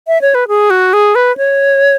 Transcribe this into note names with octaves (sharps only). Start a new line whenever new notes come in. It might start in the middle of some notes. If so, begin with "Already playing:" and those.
E5
C#5
B4
G#4
F#4
G#4
B4
C#5